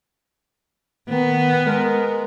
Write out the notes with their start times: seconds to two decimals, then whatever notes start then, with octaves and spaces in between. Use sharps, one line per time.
1.09 D#3 B3
1.67 G#3 A#4